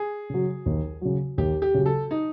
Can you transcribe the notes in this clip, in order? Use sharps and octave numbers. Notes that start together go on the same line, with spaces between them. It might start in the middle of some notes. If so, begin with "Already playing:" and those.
Already playing: G#4
C#3 F#3
D#2
C#3 F#3
D#2 G4
G4
C#3 F#3
A4
D#4